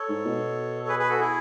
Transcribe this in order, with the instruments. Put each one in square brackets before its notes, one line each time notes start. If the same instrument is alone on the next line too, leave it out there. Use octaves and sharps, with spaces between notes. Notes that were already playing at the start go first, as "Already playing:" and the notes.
Already playing: [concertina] A4 C#5
[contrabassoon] G#2
B2
[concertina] A4
G#4 B4
G#4 B4
F#4 A4
E4 G#4